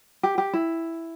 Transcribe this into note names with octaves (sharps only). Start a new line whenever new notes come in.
G4
G4
E4